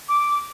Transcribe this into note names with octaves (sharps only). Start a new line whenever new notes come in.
D6